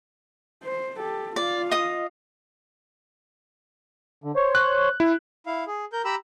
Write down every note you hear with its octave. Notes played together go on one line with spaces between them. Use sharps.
C5
G4 A4
F4 D5 F5
D#5 D#6
D3
C5 C#5
F#6
E4
E4 F5
G#4
A#4 G6
G4 A#5 B5 E6